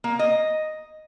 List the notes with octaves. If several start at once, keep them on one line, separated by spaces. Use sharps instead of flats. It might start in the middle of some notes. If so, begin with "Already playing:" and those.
A#3
D#5